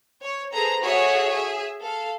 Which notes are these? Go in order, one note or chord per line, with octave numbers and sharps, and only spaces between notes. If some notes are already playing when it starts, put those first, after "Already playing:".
C#5
G#4 A4 B4 C5 A#5
F#4 G#4 A4 C#5 E5
G#4 E5
A4 F5